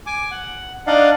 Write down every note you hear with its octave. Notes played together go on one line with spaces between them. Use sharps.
G#5 D6
F#5
D4 D#4 D5 D#5 F5 F#5